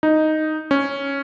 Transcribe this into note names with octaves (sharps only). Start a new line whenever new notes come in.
D#4
C#4